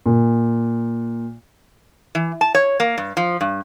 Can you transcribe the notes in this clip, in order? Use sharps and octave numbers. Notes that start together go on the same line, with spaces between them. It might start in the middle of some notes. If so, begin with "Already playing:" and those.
A#2
E3
A5
C#5
A#3
G2
F3
G2